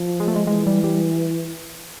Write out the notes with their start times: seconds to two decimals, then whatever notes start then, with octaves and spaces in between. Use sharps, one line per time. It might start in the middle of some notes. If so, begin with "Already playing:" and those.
Already playing: F3
0.20 G#3
0.28 A3
0.36 G#3
0.47 E3 G#3
0.67 G3
0.84 G3